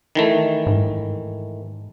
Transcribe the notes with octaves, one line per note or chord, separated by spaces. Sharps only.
D#3 E3 A3
G#2